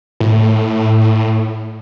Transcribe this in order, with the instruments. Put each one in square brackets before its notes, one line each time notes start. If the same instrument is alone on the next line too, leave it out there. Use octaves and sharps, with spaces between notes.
[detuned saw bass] A2